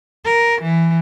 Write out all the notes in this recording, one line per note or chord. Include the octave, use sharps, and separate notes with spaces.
A#4
E3